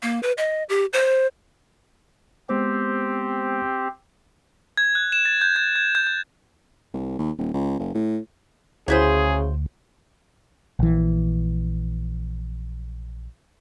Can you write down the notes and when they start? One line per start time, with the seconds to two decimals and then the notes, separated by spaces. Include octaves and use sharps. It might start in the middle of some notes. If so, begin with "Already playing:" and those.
0.03 A#3
0.23 B4
0.38 D#5
0.69 G4
0.93 C5
2.49 G#3 B3 C4 G4 C5
4.77 G#6
4.95 F#6
5.12 E7
5.25 A6
5.41 G6
5.56 G#6
5.76 G#6
5.95 G6
6.07 G6
6.94 C2
7.19 D#2
7.38 D#1
7.54 C#2
7.79 F#1
7.94 A2
8.88 D2 C#3 F#3 E4 G#4 C5
10.79 A#1 E3